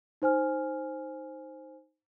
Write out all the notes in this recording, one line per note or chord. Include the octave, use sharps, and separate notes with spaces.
D#4 C5 G#5 F6